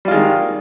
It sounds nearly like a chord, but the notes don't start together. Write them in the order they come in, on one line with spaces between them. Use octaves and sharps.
G3 F4 G#3 D#3